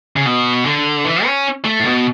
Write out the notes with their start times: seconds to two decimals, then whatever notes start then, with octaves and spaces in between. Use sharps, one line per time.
0.16 C#3
0.26 B2
0.66 D3
1.05 E3
1.25 C#4
1.65 A3
1.80 A2
1.85 B2